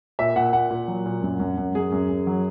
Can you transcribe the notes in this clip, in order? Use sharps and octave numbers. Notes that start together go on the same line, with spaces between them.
A#2 E5
A#2 F#5
A#2 F#5
A#2
F#3
A#2
F#2
F#2
F#2
F#2 G#4
F#2
F#2
F#3